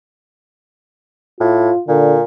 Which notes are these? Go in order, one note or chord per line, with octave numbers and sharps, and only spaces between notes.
A2 F4
A#2 D3